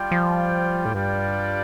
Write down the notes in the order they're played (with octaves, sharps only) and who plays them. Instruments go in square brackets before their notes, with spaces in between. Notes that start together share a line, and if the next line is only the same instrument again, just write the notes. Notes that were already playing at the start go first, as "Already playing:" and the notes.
Already playing: [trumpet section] G3 F4 D5 G5
[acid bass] F3
A2
[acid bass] G2 [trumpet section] G3 D4 F4 D5 G5